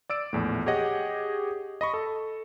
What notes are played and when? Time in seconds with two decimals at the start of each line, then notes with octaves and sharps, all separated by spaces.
0.09 D5 E6 D7
0.33 A#1 E2 A2
0.66 G4 G#4 C#5 D#5 F#5
1.81 D#5 B5 C#6
1.94 A4